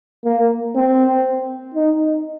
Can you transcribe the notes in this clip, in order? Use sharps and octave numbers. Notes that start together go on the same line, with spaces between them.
A#3
C4
D#4